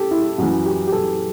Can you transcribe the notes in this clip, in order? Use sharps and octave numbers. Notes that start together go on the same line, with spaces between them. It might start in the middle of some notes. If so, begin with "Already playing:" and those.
Already playing: G4 A4
E4
F#2 E3 F#4
G4
G4
A4